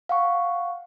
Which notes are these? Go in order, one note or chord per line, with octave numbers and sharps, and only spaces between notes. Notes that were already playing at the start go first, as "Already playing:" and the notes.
F5 F#5 C#6